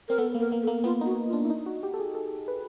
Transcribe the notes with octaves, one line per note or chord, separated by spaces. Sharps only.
C4 A#4
B3 A4
A#3
A#4
A#3
A4
A#3
B3 F4
D#4 F#4
F4
D4
E4
D#4
F#4
G4
A4
G#4
A4
B4